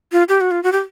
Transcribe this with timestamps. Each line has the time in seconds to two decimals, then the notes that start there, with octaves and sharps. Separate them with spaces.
0.12 F4
0.29 G4
0.41 F#4
0.51 F4
0.63 F#4
0.72 G4